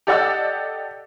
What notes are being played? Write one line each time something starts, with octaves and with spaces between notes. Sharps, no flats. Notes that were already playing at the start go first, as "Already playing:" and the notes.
G4 A4 D5 D#5 F#5 E6